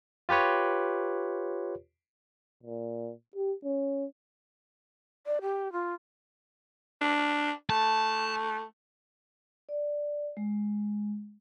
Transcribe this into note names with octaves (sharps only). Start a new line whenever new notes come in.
F4 G4 B4 C#5
A#2
G4
C#4
D5
G4
F4
D4
A3 A5
D5
G#3